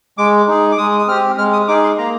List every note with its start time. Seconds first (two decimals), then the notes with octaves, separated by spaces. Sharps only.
0.18 G#3 D6
0.48 D#4 G#4
0.72 D6
0.78 G#3 D#6
0.99 D#6
1.08 C4 G4 F6
1.38 G#3 F6
1.53 D#6
1.68 D#4 G#4 D6
1.83 C6
1.98 A#3 A#5